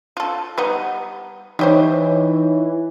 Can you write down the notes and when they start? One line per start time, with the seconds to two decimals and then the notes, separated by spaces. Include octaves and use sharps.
0.17 F4 A4
0.58 G3 B3 D#4
1.59 E3 G3 D#4 G4 C5 C#5